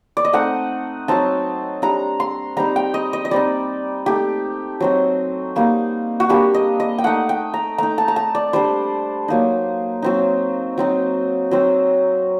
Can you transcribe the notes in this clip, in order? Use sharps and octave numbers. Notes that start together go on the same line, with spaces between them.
D5
D#5
A3 C4 D#4 F#5
F#3 C4 D#4 A5
G3 D4 A#5
C6
G3 C4 D#4 A#5
G5
D#5
D#5
D#5
G3 C4 D#4 D5
A3 D#4 G4
F#3 C4 D#4
G3 A#3 D#4
F#4
G3 A#3 D4 G4
D#5
D#5
G5
A3 D#4 F#5
G5
A#5
A3 D#4 A#5
A5
A#5
A5
D5
G3 D4 C5
F#3 A#3 D#4
F#3 C4 D#4
F#3 C4 D#4
F#3 C4 D#4